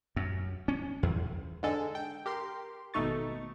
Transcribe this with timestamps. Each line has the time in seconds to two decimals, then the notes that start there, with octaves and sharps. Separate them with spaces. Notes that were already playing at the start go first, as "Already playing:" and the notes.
0.16 F#2
0.68 C#4
1.03 E2
1.63 G#2 D3 G#3 A4
1.95 G5
2.26 G4 A#4 C6
2.94 G#1 B2 A3 D#4 C#6 A6